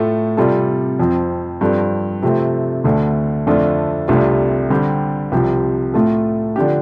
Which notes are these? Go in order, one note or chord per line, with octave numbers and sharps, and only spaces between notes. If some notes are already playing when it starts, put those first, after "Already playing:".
Already playing: A2 A3 F4 A4
C3 G3 F4 A4
F2 F3 C4
G2 F3 C4 A4
C3 F3 A3 C4
D2 D3 A3
F2 D3 A3 D4 F4
C2 C3 A3 D4 F4
D3 G3 C4 G4
C2 C3 F3 C4 G4
A2 A3 F4 A4
D3 F3 D4 G4